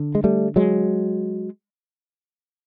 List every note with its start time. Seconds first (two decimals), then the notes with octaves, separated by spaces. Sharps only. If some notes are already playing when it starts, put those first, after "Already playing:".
Already playing: D3
0.15 G#3
0.24 G3 A3
0.56 F#3 G#3